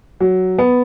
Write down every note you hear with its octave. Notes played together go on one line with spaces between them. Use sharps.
F#3
B3